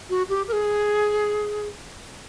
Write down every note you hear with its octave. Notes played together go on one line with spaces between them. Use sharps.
F#4
G4
A#4
G#4